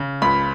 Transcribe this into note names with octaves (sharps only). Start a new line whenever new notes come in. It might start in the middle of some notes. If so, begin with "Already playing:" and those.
Already playing: C#3
C#2 B5